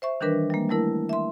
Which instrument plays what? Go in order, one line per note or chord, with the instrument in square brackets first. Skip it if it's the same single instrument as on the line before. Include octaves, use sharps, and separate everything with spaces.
[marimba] C5 E5 C#6
D#3 E3 G3 D4 A#4 B4
G3 G#3 A#3
G3 A3 E4 A#4
E5 C6